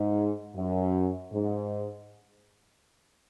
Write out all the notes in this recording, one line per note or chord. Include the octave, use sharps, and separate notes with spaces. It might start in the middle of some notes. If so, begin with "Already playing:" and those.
Already playing: G#2
F#2
G#2